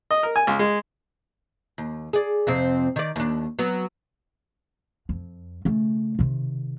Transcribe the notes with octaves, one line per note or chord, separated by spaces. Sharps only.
D#5
A#4
G#5
C#2
G#3
D#2
G#4 D5
F2 C3 C4
D#3 D5
D#2 D4
F#3 B3
F2
C#3 A3
C3 D#3